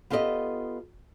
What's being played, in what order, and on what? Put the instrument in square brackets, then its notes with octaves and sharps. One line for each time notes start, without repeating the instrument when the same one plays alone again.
[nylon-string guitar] B3 F4 G4 A4 D5 D#5